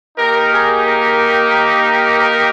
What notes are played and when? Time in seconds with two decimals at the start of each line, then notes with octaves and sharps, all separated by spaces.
0.18 A#3 D#4 G4 A#4
0.52 G#4
0.85 A#4
2.20 A#4